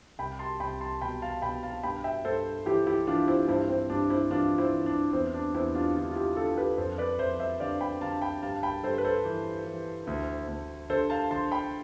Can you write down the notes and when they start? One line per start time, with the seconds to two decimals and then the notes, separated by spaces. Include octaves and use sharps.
0.19 C2 G5 B5
0.39 A5 C6
0.60 C2 G5 B5
0.81 A5 C6
1.01 B2 G5 B5
1.22 F5 A5
1.42 B2 G5 B5
1.63 F5 A5
1.84 G2 G5 B5
2.04 E5 G5
2.25 G2 A4 C5
2.66 E3 E4 G4
2.87 E4 G4
3.07 E3 D4 F4
3.28 C4 E4
3.48 G2 C4 E4
3.69 C4
3.90 G2 D4
4.10 C4 E4
4.31 E3 D4 F4
4.58 C4 E4
4.73 E3
4.86 D4
5.13 E2 C4
5.34 D4
5.54 E2 C4 E4
5.75 D4 F4
5.96 D3 D4 F4
6.11 F4
6.16 E4 G4
6.37 D3 F4 A4
6.57 G4 B4
6.78 F2 A4 C5
6.98 B4 D5
7.19 F2 C5 E5
7.39 C5 E5
7.60 D3 D5 F5
7.81 G5 B5
8.01 D3 F5 A5
8.21 G5 B5
8.42 G2 F5 A5
8.63 G5 B5
8.83 G2 A4 C5
8.98 B4
9.04 A4 C5
9.25 E3
9.66 E3
10.07 D2
10.48 D2
10.90 D3 A4 C5
11.10 F5 A5
11.31 D3 A5 C6
11.52 G5 B5